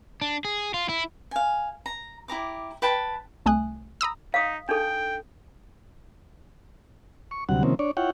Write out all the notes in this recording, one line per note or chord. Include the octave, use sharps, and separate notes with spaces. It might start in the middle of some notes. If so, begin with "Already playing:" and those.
D4
G#4
F4
E4
F5 G#5
A#5
E4 G4 A#5 D6
B4 G5 A5 B5
C2 A3 G#5 D#6 F#6
A#5 B5 D#6 E6
D#4 F5 D#6
D4 D#4 A4 G5
C#6
D2 C3 F#3 G3 F#5
C3 D#3 F3 A#3 C4 C#4
D4 C#5 D5
E4 F4 C#5 F#5 G5